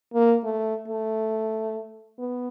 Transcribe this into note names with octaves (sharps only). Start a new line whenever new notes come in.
A#3
A3
A3
B3